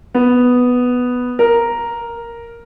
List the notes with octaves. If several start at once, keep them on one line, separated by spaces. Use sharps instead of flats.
B3
A#4